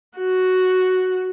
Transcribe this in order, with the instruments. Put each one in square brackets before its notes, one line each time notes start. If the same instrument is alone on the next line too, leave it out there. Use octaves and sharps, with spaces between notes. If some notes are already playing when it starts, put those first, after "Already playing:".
[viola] F#4